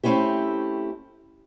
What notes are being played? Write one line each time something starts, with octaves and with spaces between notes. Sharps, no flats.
A3 C4 C#4 E4 G4